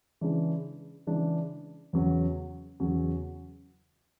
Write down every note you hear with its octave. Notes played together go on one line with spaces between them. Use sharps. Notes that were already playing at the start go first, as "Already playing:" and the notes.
C#3 E3 G#3 D4
C#3 E3 G#3 D4
E2 C#3 F#3 C#4
E2 C#3 F#3 C#4